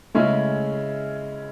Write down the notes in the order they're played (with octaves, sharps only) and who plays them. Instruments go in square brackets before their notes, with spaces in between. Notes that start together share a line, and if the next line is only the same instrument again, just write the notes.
[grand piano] C#3 G#3 C#4 E4 [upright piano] A3